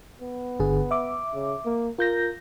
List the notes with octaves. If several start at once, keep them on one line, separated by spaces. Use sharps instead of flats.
B3
G1 D3 G#4
E5 D6
C#3
A#3
F4 A#4 G6 A#6